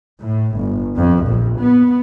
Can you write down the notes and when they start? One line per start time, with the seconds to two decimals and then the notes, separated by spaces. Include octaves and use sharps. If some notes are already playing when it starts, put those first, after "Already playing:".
0.22 A2
0.58 G1
0.96 F2
1.26 A#1
1.59 B3